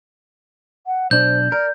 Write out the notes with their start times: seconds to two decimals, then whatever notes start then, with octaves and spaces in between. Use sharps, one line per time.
0.87 F#5
1.11 B1 D4 C5 G6
1.52 A#4 D5